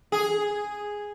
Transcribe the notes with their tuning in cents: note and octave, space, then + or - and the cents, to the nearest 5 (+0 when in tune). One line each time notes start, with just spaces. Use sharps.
G#4 -5